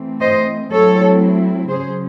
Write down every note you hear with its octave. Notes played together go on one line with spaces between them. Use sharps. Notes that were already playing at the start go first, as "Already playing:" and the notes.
Already playing: E3 A3 C4
C5 D#5
F#3 A3 C4 E4 A4 C#5
C#3 F#3 C#4 G#4 C5